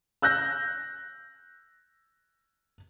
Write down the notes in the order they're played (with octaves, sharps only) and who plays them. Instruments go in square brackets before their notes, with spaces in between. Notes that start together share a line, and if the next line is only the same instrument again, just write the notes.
[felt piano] E6 F#6 G6 A#6